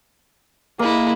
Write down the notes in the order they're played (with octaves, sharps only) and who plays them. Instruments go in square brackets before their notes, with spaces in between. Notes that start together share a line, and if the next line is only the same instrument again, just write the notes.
[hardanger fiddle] G#3 E4 [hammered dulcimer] A#3